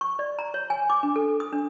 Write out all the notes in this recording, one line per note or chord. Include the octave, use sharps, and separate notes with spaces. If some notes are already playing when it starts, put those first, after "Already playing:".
C#6
D5
A#5
C#5
G#5
D6
D4
A4
D#6
D4